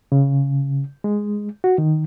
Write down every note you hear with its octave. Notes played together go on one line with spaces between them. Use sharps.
C#3
G#3
F#4
D#3